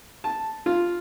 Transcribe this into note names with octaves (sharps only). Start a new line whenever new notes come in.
A5
F4